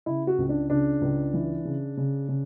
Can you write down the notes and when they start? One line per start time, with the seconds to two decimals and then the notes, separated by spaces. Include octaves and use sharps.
0.06 C#3 E4
0.27 F#4
0.38 C#2
0.49 D4
0.70 C#3 D4
1.01 C#2
1.34 E3
1.65 C#3
1.97 C#3
2.28 C#3